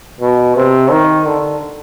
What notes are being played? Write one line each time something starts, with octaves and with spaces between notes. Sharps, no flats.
B2
C3
D#3
D3